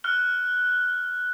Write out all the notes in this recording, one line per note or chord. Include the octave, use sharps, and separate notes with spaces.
F6 F#6 G7